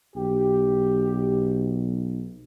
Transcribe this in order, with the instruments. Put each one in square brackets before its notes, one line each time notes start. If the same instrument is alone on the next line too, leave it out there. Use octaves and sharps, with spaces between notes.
[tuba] B1 [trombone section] G4